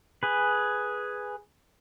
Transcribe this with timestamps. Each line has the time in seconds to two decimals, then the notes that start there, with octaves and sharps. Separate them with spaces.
0.23 G#4 B4